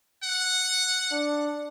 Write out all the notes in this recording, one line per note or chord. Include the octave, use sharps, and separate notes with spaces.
F#5
D4